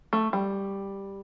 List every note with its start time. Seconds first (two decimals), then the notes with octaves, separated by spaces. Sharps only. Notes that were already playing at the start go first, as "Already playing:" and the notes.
0.13 A3
0.33 G3